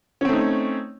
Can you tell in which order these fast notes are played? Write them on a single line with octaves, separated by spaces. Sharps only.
C#4 C4 A3 D#4